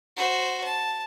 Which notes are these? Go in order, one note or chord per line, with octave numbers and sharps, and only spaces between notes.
F#4 C5
A5